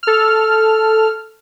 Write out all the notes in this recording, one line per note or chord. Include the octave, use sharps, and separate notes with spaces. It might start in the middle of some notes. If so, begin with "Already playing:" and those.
A4 F6